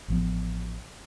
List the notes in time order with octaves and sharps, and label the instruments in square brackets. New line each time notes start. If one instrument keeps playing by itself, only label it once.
[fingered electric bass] A1 F3 B3